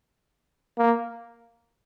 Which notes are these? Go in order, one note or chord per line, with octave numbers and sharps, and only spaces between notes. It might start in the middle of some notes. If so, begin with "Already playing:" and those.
A#3